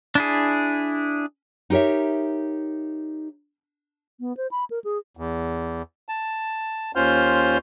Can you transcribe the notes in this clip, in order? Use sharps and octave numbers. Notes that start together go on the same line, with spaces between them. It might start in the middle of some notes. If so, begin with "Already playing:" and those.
D4 E4 G#4
D#4 G4 A#4 C#5 E5
B3
C5
B5
A#4
G#4
E2
A5
D#2 C#4 F4 C5 F6 G6